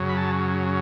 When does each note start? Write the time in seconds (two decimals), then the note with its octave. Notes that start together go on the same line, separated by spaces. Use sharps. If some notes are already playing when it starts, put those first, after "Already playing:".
Already playing: F#2 C#3 F#3
0.09 B5
0.17 A5